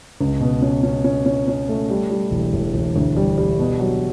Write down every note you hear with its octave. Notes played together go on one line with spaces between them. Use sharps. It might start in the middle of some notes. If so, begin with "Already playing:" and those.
C#2
B2
C#4
C#4
C#4
C#4
C#4
A3
G3
G3
E1
E1
E1
D2
G3
G3
B2
F#3